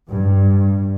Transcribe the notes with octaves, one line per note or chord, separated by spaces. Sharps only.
G2